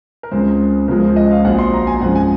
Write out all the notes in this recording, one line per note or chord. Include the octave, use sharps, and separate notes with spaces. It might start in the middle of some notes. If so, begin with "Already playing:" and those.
A#4
C#2 C#3 G#3 C4 C5
C#2 C#3 F3 G#3 A#4
C5
D#5
F5
A#1 A#2 F#3 C4 F#5
C6
A#5
G#5
F#2 F3 G#3 C4 F#5
G#5